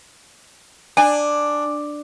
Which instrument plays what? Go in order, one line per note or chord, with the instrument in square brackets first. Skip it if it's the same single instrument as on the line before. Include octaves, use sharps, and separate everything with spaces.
[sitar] D4 [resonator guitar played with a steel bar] G#5